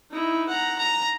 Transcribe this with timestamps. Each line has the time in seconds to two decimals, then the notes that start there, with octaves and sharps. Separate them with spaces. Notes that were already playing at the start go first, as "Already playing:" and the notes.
0.11 D#4 E4
0.49 F#5 A#5
0.79 A#5